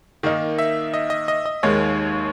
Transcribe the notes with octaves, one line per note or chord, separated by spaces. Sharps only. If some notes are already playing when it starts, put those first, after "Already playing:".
D#3 A#3 D#4
E5
D#5
D#5
D#5
D#5
D#2 D#3 G#3 C#5